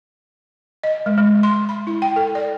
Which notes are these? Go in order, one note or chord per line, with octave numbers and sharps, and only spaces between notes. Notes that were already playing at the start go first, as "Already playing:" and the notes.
D#5
G#3
G#3
C6
B5
E4
G5
A4
D5